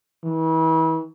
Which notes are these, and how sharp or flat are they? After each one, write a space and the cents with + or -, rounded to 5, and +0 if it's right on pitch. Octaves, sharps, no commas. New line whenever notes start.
E3 -35